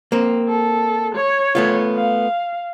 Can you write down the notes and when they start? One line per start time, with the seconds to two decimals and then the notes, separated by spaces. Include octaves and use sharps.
0.12 A#3 C4
0.49 A4
1.15 C#5
1.55 A3 B3 F4
1.96 F5